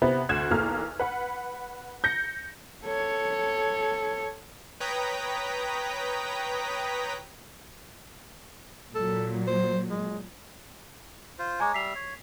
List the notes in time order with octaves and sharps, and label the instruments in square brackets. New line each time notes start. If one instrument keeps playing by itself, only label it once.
[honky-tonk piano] C3 B3 C4 E4
D2 F#6 G#6 E7
B1 E2 A#3 A4 F6
B4 F#5 B5
G6 A#6 C#7
[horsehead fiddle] A4 C#5
[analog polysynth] B4 C#5 G5 A#5 D#6 B6
[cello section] A#2 F#3 [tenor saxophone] A4
[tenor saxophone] C5
G#3
[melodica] F4 C5
[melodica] G#3 C#5 [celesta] G#5 A#5 D6
[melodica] G3 E5 [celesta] B6 C7 F7
[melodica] C#5